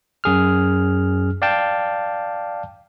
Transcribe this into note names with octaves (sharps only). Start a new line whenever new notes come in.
F#2 G#4 F6
D5 F5 G5 A5